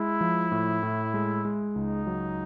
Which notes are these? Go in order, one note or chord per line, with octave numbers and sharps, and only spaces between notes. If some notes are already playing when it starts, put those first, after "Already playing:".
Already playing: G#3 E4
F3
A2
A2
G#3
G#3
C#2 D#4
F#3